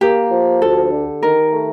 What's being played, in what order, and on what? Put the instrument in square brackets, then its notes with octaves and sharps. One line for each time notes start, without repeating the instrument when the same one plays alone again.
[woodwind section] A#3 [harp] G4
[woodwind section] F3
[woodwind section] D2 [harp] A4
[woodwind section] D3
[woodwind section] D#3 [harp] A#4
[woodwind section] A3